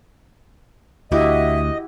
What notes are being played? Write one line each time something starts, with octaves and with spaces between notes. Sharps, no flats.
D2 E4 F#4 G4 D#5 E5